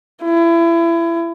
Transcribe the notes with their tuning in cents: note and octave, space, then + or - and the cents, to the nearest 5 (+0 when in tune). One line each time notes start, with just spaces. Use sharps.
E4 +30